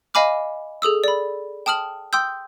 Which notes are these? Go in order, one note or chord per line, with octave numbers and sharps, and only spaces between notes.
D#5 F5 G#5 B5 D6 F6
G#4 A4 D#6 E6
D5 B5
G5 A5 D#6 F6 F#7
G5 C6 D#6 E6 G6